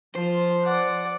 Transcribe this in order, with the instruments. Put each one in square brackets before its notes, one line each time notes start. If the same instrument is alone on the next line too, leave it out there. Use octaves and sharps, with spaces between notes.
[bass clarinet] F3 [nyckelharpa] F4 [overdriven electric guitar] C5
[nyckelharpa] D5 F#5